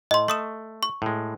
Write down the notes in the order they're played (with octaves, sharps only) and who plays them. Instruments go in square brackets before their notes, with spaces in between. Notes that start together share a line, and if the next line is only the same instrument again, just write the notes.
[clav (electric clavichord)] A2 [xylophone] D#5 C6
[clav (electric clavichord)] A3 [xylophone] C#6 D#6 E7
[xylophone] C#6
[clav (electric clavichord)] A2 G#3